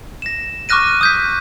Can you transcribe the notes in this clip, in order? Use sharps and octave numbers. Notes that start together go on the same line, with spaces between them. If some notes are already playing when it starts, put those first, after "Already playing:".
A#6 E7
C#6 D6 F6 F#6 A#6 D#7
D#6 G6 B6